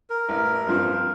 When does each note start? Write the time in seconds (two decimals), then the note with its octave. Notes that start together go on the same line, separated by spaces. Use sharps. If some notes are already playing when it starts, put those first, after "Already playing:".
0.10 A#4
0.29 A1
0.67 G2 F3 C4 F4